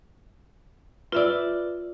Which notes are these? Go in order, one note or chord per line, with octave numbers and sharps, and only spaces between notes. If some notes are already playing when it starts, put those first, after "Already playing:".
F4 B4 D5 E5 E6